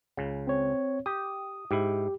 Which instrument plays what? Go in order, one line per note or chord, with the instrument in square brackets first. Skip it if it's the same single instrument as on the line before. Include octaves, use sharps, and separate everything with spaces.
[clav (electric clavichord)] C#2 C#3
[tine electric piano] C4 C#5
[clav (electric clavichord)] G4 [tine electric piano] D#6
[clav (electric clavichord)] G#2 E4 [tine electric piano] G4